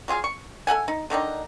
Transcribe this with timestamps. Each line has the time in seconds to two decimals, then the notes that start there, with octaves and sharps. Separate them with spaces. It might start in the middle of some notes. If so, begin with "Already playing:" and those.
0.08 F#3 F4 G#4 F5
0.24 C#6
0.67 A4 E5 F#5 G#5
0.88 D#4
1.10 D3 D#3 D4 D#4